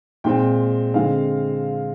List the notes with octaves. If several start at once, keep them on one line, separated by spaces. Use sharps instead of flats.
A#2 G#3 C4 G5
D3 G#3 C4 F5